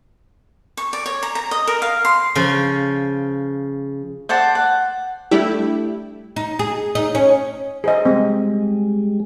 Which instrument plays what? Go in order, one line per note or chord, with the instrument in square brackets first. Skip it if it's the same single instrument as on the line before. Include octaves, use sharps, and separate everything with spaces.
[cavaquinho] C#6
D5
C#5
A#5
A#5
D#5
A#4
F5
C6
[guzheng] C#3 F3
[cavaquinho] C5 D5 F#5 A5
F#5
[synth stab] G3 A3 D4 E4 G4
[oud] D#4
G#4
D#4
C#4
[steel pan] G#4 C5 D#5
[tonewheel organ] G3 G#3 [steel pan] C4